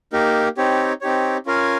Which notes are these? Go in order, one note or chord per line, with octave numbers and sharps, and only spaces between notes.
A#3 D#4 G4 A#4
C4 D#4 G4 C#5
C4 D#4 G4 C#5
C#4 F4 A#4 F5 G#5